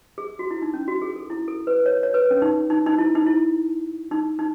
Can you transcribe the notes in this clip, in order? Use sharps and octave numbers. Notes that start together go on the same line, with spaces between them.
G#4
F#4
E4
D#4
C#4
F#4
G#4
A4
E4
A4
B4
C#5
C#5
B4
C#4
D#4
D#4
D#4
E4
D#4
E4
D#4
D#4